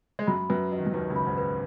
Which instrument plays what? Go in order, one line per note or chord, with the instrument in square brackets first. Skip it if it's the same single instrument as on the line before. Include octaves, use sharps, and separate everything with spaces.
[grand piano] G#3
[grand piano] F#2 F#3 [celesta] B5
[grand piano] F#2 F#3 [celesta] B4
[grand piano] F#3 [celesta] D#5
[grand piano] D#3
F#2 F#3
[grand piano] D#2 D#3 [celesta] B4
[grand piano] C#2 C#3
[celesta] B5
[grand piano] G#2
[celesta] B4